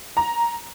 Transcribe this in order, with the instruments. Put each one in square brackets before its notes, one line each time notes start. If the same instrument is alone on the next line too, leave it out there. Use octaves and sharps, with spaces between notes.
[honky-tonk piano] A#5